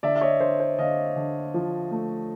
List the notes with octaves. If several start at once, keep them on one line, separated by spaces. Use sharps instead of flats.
D3 D5 E5
E5
C#5 D#5
D3 C5
C5
D3 D#5 F5
D3
F3
A3